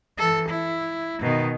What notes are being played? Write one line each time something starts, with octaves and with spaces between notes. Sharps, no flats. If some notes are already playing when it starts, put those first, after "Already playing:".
E3 A4
E4
B2 D#3